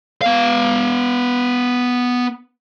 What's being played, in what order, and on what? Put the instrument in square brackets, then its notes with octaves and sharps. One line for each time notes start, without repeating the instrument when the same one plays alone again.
[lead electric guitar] B3 F5